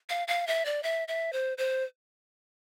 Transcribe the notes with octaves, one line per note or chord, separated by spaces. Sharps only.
F5
F5
E5
D5
E5
E5
C5
C5